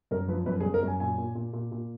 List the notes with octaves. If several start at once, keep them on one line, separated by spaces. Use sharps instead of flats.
F#2 A#4
F3 B4
F#2 B4
G#4
F#2
A#4
F#2 G#5
A#2 G#5
A#2
A#2
A#2
A#2